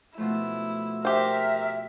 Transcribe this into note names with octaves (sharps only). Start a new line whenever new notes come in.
B2 F3 A3 E4
G4 A#4 C5 E5